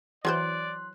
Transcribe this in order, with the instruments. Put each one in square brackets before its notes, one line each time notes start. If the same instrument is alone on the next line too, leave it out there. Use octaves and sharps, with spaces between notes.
[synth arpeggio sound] E3 G6 [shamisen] F#3 A#4 C5 [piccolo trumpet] D5 [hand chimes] C6 F#6